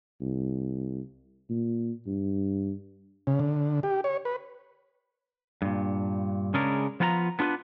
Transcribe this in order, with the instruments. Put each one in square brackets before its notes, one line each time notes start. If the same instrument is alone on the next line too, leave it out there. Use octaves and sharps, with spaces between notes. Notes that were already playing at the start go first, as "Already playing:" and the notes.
[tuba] C2
A#2
G2
[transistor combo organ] C#3
D3
G4
C#5
B4
[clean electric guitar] G2 A#2
C#3 G#3 C#4 D4 A#4
F3 B3 F4 F#5 A#5
B3 D4 F4 A#4 B4